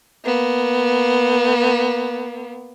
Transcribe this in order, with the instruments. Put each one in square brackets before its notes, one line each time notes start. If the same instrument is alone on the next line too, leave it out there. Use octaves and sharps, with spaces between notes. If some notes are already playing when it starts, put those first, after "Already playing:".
[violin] A#3 B3